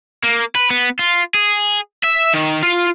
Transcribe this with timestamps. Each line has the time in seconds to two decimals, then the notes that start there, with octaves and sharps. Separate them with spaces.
0.24 A#3
0.56 B4
0.70 B3
0.99 F4
1.34 G#4
2.03 E5
2.33 D#3
2.63 F4